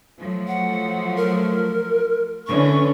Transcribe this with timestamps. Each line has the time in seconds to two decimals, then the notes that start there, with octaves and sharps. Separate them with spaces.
0.19 F3 F#3 A3
0.48 F#5
1.17 A#4
2.47 D3 E3 C#4 C#6